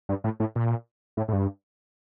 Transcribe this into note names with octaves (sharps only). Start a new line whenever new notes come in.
G2
A2
A2
A#2
A2
A2
G2